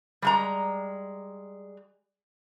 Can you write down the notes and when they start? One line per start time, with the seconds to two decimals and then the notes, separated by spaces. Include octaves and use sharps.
0.22 G3 G#3 A#5